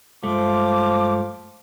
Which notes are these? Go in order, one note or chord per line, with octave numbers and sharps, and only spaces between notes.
G2 F3 G#3 A3 D6